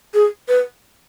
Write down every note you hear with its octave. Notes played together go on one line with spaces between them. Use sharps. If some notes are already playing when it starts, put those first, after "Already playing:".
G#4
B4